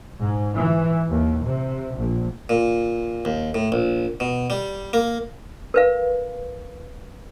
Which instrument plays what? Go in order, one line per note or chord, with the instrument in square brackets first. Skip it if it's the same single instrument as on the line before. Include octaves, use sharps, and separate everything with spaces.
[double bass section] G#2
E3
D#2
C3
A#1
[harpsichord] A#2
D#2
A2
A#1
B2
G3
A#3
[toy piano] A#4 B4 F5